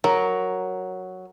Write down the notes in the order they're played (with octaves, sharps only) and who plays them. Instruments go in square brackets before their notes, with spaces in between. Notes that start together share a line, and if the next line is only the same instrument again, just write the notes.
[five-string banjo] F#3 [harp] A#4